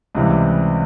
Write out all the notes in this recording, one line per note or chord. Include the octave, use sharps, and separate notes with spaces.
C#2 C3 E3 G3